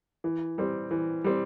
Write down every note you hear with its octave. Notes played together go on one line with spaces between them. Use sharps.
E3
G3 C4
E3
G3 C4